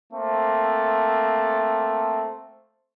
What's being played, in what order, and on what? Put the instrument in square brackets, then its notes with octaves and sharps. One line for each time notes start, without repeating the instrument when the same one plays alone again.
[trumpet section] A3 A#3 C4